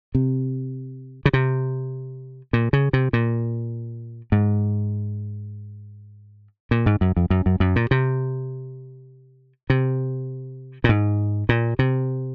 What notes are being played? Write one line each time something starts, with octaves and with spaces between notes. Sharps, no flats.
C3
C#3
C3
A#2
C#3
C3
A#2
G#2
A#2
G#2
F#2
F2
F#2
F#2
F#2
A#2
C3
C3
A#2
G#2
A#2
C3